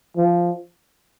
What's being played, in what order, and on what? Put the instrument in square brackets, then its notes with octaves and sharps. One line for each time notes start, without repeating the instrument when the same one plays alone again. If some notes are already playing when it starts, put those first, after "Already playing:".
[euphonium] F3